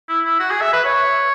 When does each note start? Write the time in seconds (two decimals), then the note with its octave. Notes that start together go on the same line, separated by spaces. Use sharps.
0.09 E4
0.24 E4
0.40 F#4
0.51 G#4
0.61 E5
0.73 B4
0.85 C#5